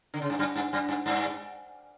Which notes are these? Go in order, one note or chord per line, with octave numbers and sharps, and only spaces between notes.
D3
C#3
G2
F#2
G2
F#2
G2
G2